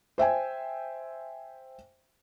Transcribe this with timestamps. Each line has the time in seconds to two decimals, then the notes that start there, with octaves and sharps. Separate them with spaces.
0.18 C5 E5 G5 G#5